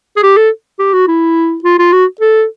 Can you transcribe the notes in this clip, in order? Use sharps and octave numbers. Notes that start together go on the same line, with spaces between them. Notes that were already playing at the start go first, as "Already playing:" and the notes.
G#4
G4
A4
G4
F#4
E4
F4
F4
F#4
A4